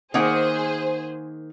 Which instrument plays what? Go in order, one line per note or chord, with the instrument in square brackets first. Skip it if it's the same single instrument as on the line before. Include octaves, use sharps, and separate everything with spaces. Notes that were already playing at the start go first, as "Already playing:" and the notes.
[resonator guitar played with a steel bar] D#3 A#3 F#5 [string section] G#4 C5